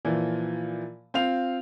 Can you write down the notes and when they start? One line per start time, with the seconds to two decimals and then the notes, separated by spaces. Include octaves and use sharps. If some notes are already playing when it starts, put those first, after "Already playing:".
0.05 A#2 E3 F3
1.14 C4 F4 F5 F7